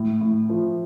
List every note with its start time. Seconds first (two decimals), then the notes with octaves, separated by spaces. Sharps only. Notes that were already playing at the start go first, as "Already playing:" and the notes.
Already playing: A2
0.21 A2
0.49 F3